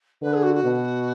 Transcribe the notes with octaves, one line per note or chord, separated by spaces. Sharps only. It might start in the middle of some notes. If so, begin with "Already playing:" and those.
D3 B4
G#4
F#4
F#4
B2